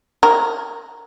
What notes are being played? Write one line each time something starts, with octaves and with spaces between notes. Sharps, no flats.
A#4